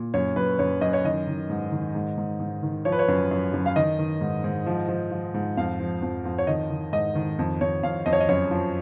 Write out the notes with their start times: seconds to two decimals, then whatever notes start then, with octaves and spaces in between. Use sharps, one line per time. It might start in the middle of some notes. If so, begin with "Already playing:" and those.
Already playing: A#2
0.14 F#2 C#5
0.36 F#2 B4
0.59 F#2 C#5
0.81 F#2 D#5
0.93 C#5
1.04 D#3 D#5
1.27 D#3
1.50 G#2
1.72 D#3
1.95 G#2
2.17 G#2
2.40 G#2
2.63 D#3
2.85 F3 C#5
2.92 B4
2.99 C#5
3.08 F#2
3.31 F#2
3.54 F#2
3.66 F5
3.76 D#3 D#5
3.99 D#3
4.21 G#2
4.44 G#2
4.66 F3
4.88 F3
5.11 F3
5.34 G#2
5.57 F2 F5
5.80 F3
6.02 F2
6.25 F2
6.38 C#5
6.47 D#3 D#5
6.70 D#3
6.93 G#2 D#5
7.15 D#3
7.39 F2
7.61 F2 C#5
7.83 F2 F5
8.06 F2 D#5
8.13 C#5
8.20 D#5
8.29 F#2 C#5
8.51 F3